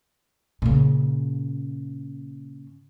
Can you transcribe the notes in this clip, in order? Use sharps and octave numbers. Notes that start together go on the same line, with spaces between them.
A#2 C#3